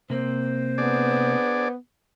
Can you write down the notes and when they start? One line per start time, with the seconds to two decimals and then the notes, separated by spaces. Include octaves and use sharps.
0.10 C3 A#3 C4 C5
0.78 B3 D4 G#4 D5